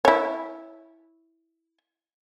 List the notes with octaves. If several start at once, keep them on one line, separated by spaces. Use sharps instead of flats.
E4 C#5